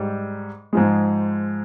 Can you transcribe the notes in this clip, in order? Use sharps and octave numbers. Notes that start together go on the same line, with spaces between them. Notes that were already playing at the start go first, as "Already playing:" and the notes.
Already playing: G#2 G3
G#2 F3 G#3